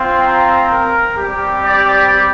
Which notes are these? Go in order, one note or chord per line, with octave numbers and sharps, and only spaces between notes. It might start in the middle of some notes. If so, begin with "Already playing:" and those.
Already playing: C4 F4 C6
A#5
A#4
G3 C4 G4
D5